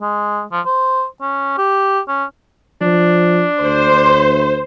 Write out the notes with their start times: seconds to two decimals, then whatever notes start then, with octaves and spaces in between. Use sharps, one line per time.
0.01 G#3
0.52 F3
0.66 C5
1.21 C#4
1.58 G4
2.08 C#4
2.81 F3 D4
3.62 D2 C5